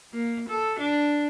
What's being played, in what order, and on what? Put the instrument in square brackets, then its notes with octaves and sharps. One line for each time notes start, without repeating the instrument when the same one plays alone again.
[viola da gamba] A#3
A4
D4